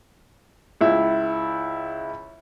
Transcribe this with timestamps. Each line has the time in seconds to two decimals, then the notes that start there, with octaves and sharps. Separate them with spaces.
0.81 C#2 E4